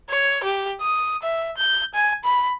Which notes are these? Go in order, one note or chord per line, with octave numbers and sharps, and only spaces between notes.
C#5
G4
D#6
E5
G6
G#5
B5